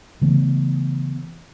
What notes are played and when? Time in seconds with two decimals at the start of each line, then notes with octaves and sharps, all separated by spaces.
0.21 C#3 E3 A3 B3